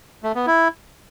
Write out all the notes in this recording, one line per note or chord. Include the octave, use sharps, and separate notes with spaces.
A3
B3
E4